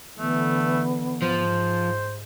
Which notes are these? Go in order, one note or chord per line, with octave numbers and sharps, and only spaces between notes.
D3 E3 A3 B3
G#2 F3 C5